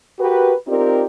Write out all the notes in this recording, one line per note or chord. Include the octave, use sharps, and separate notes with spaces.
F#4 G4 A#4 B4
C4 D#4 F4 G4 A#4 D5